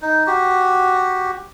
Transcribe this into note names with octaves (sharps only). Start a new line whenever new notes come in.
D#4
F#4 G4